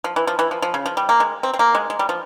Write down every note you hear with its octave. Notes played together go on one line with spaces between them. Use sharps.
F3
E3
F3
E3
F3
F3
C#3
F3
G3
A#3
G#3
C4
C4
A#3
G#3
G#3
G3
F3